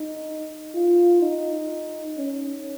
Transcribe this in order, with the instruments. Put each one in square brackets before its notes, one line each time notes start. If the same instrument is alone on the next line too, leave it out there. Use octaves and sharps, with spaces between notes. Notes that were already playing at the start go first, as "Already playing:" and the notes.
Already playing: [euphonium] D#4
F4
D#4
C#4